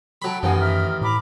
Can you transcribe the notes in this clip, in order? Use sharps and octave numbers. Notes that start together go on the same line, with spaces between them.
F#3 A4 G5 B5
A1 F#2 D#3 F5 F#5 G#5
E5 A#5 F6
A2 A#5 B5 D6